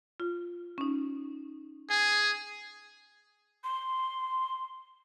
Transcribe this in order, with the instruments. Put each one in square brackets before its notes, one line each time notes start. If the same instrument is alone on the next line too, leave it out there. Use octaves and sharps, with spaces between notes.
[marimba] F4
C#4 D#4
[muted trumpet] G#4 [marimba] G#5
[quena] C6